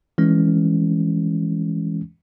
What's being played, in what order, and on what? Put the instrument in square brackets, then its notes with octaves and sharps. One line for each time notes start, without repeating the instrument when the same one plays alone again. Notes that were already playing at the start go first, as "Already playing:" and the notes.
[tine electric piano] E3 G#3 C#4